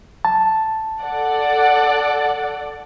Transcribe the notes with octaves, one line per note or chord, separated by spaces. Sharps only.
A5
A4 D5 F#5